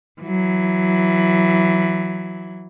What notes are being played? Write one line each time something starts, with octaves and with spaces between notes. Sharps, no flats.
E3 F#3